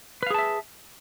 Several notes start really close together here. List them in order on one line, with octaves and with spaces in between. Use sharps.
B4 F5 G#4 A5 E5